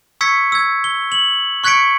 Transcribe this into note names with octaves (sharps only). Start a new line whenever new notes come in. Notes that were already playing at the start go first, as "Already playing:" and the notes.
C#6 E6 G#6 B6 C#7
E6 G#6
G7
F#7
C#6 F#6 G#6 B6 C#7 D7